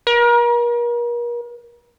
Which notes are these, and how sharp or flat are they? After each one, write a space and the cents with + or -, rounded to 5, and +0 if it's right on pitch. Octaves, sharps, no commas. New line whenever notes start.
A#4 +40